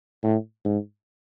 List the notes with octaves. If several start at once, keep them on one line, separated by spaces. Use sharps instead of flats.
A2
G#2